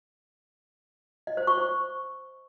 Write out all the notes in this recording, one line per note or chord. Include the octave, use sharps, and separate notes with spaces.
D#5
C5
C#6
C5